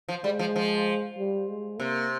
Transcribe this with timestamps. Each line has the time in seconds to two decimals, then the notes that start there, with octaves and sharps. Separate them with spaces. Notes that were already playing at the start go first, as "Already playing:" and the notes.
0.08 F3
0.24 G3 G#3
0.39 F3
0.56 F3
1.18 G3
1.49 G#3
1.79 C3 A#3